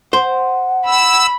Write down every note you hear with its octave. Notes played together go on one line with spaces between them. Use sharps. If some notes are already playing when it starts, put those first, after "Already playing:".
C5 F#5
B5 E6